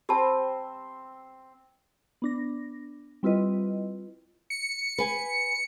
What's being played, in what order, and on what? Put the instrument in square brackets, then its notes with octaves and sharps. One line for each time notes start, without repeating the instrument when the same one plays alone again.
[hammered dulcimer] C4 [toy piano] G4 A5 [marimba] B5
[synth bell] B3 D4 A#6
G3 C4 E4 F4 B4 D#5
[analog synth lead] C#7
[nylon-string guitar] B4 G#5